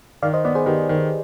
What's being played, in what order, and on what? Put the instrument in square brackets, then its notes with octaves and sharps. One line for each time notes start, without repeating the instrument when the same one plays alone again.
[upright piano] D#3 [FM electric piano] D5 F5
[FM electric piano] C5 D#5
[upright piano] B3 [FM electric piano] B4 D5
[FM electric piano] G#4 C5
[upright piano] D#3 [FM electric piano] G4 B4
[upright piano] D#3